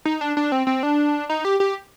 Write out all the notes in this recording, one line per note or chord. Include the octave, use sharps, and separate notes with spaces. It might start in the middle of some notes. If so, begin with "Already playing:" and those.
D#4
D4
D4
C4
C4
D4
D#4
G4
G4